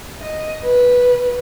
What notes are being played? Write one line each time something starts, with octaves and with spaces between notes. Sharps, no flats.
D#5
B4